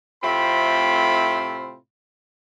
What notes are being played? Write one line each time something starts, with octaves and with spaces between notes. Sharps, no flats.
A2 C3 A3 C4 F4 B5